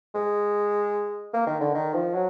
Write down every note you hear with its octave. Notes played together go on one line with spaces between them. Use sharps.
G#3
A#3
D#3
D3
D#3
F3
F#3